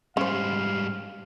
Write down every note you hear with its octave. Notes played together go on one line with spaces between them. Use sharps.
G#2 G3 C#4 C5 F5